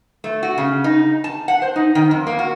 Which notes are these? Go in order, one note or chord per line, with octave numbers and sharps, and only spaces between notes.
A3
F#4
C#3
D#4
A5
F#5
C5
D#4
D#3
F2
A#3
F#4